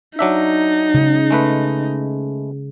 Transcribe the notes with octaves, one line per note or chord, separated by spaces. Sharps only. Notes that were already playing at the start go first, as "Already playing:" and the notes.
F#3 D4 D#4 E5
C#3
G#3 A3 B4